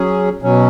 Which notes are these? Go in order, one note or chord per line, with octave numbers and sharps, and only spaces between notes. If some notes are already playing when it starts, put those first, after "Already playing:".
Already playing: F#3 C#4 G#4
B2 F#3 C#4